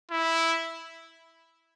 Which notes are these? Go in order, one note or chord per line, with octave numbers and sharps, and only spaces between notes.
E4